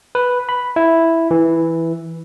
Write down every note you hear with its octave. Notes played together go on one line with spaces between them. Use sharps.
B4
B5
E4
E3